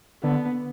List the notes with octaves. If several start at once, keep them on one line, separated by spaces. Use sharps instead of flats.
D3 B3